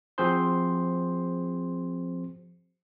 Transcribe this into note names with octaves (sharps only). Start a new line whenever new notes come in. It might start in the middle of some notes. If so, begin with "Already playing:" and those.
F3 C4 F#4 G#4 C5 C6